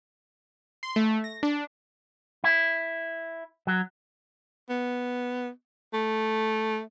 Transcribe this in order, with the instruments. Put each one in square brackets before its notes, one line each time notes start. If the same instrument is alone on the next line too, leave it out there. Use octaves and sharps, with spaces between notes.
[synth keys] C6
A3
A#6
D4
[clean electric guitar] E4
F#3
[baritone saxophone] B3
A3